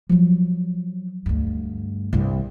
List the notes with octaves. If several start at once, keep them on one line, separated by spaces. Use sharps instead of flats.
F3 F#3
D2 G2
C2 G2